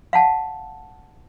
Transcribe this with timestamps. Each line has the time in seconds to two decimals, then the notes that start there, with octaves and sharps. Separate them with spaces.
0.13 F5 F#5 A5